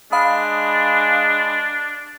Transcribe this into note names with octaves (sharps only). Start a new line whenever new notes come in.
G#3 D4 F5 B5 D#6